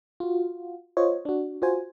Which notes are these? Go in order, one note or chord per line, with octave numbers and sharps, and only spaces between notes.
F4 F#4
F4 C5 C#5 D#5
D4 F#4
F4 F#4 C5 G#5